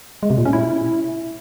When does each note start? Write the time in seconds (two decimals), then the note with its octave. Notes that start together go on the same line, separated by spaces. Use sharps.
0.23 G#3
0.30 C3
0.38 A#2
0.45 C#4
0.53 E4